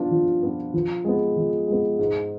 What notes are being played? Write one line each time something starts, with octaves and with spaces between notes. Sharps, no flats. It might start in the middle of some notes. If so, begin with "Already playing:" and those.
Already playing: F3 B3 D4 F4
F3
B3 D4 F4
F3
G#3 B3
F3
G#3 B3
G#2